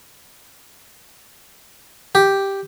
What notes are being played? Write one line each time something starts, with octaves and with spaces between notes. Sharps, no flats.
G4